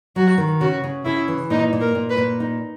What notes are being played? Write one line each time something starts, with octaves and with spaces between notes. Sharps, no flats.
F#3 F#4
D#3
C#3 F#4
C#3
C#3 E4
E3
A#2 D#4
A#2
A#4
A#2
B4
A#2
D#4